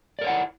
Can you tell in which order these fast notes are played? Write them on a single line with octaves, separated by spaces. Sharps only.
D5 A#4 C#5 F#5 E4